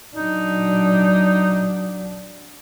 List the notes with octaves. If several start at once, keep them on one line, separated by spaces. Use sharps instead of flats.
F#3 D4 D#4